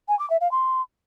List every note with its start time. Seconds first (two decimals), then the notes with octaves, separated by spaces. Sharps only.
0.08 G#5
0.19 D6
0.30 E5
0.41 F5
0.51 C6